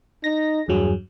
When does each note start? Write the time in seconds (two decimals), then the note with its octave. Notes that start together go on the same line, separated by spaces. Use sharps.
0.24 D#4 A#6
0.68 E2 G2 F#3 G#4